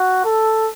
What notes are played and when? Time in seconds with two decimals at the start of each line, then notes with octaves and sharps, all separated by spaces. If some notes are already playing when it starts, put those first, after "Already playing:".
Already playing: F#4
0.25 A4